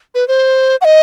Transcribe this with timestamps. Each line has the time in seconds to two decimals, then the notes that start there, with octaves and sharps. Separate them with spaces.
0.15 B4
0.28 C5
0.81 F#5
0.85 D#5